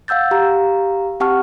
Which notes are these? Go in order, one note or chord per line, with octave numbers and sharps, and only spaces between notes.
F5 F#5 E6 G6 A6
G4 F5 A#5
C4 G4 F#5 A5 C#6 F6